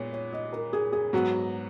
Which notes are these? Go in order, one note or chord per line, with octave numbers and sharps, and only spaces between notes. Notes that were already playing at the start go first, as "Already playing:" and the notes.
Already playing: A#2 G#3 B3 C#5
C#5
D#5
A#4
G#4
G#4
G#2 F#3 B3 F#4